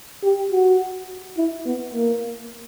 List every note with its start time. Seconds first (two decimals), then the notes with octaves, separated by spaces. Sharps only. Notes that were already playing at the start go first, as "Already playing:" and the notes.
0.23 G4
0.51 F#4
1.37 E4
1.66 B3
1.94 A#3